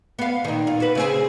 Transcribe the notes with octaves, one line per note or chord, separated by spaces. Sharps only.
B3 F5
A#2 D#3
F4
F#4 B4
C#3 C4 G#4